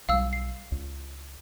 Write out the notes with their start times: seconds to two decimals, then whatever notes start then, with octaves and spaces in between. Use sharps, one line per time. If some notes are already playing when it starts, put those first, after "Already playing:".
0.09 B1 G3 F5 E6
0.33 C7
0.72 C#2